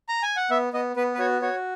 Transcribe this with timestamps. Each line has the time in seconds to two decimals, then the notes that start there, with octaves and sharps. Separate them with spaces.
0.09 A#5
0.23 G#5
0.36 F#5
0.50 B3 E5
0.73 B3 D#5
0.96 B3 B4
1.14 B4
1.19 F#4 C#5
1.42 F#4 C#5